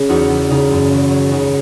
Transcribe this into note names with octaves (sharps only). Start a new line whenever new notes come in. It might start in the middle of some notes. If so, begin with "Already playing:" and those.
Already playing: C#3 C#4
E2 D#4 F#4
E2
C#3 D#4
F#2
G#1
F#3
C#3 D#4 F#4